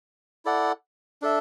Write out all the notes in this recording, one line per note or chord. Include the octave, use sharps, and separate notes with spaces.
E4 A4 D5 F#5
D4 A4 E5